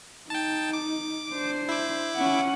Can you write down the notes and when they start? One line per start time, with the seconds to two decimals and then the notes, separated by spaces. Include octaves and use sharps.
0.30 D#4 G5 A5
0.73 D6
1.31 D4 C5
1.69 E4 D6
2.16 C#4 F#5